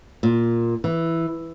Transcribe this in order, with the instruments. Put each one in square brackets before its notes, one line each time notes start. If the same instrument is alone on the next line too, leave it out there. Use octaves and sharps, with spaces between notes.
[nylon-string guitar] A#2
E3